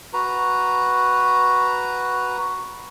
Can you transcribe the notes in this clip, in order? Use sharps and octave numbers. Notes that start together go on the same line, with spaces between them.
F#4 B4 A#5